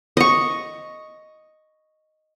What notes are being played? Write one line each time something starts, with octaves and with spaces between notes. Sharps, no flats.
D#5 C#6